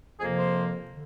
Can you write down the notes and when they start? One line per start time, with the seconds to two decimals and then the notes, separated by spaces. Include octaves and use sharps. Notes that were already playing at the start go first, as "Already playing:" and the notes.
0.19 F2 C3 F3 A#3 G#4
0.37 C5
0.90 D3